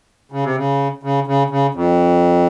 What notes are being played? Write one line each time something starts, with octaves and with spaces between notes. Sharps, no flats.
C#3
C3
C#3
C#3
C#3
C#3
F2